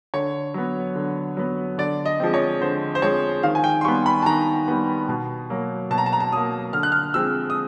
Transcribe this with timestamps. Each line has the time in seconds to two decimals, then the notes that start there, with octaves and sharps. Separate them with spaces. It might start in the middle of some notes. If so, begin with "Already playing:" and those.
0.14 D3 C#5
0.54 F#3 B3
0.95 D3
1.37 F#3 B3
1.78 D3 D5
2.05 D#5
2.20 F3 G#3 C4
2.34 C#5
2.61 D3 C5
2.95 C5
3.02 F3 G#3 C4 C#5
3.43 D#3 F5
3.55 G#5
3.64 G5
3.81 C6
3.84 G3 C#6
3.88 B3
4.06 B5
4.22 A5
4.26 D#3 A#5
4.68 G3 B3
5.09 B2
5.50 F#3 A#3
5.90 B2 A5
5.98 A#5
6.06 A5
6.13 A#5
6.20 A5
6.32 F#3 A#3 D#6
6.73 D3 F6
6.83 F#6
6.92 F6
7.14 F3 G#3 C4 E6
7.50 D#6